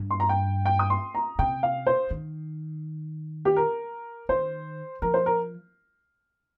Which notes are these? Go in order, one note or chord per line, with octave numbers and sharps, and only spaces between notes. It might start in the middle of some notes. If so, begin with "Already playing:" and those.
Already playing: G2
C6
A#5
G5
G5
D#6
C6
A#5
C3 G5
F5
C5
D#3
G4
A#4
D#3 C5
F3 A#4
C5
A#4